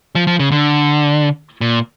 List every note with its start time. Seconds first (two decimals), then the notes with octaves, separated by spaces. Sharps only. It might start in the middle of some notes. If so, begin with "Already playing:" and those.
0.15 F3
0.27 F3
0.39 C#3
0.52 D3
1.61 A#2